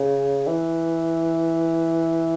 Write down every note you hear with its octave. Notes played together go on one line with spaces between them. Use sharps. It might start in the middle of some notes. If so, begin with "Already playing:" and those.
Already playing: C#3
E3